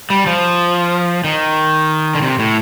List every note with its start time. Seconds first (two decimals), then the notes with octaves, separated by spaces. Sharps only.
0.10 G3
0.27 F3
1.24 D#3
2.15 D3
2.22 C3
2.39 A2